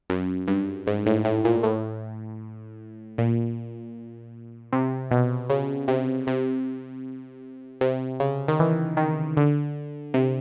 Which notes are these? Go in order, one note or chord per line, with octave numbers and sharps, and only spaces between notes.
F#2
G2
G#2
A2
A2
A#2
A2
A#2
C3
B2
C#3
C3
C3
C3
C#3
D#3
E3
D#3
D3
C3